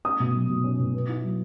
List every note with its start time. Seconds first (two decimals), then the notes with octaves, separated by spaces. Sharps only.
0.05 C#4 D#6
0.20 B2
0.35 F#3
0.49 B2
0.64 C#4
0.79 B2
0.93 B3
1.09 E4
1.24 F#3